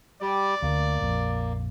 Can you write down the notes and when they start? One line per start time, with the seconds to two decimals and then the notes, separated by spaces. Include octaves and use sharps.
0.21 G3 G4 D5
0.62 D2 A#3
1.01 A#1 F2 A#2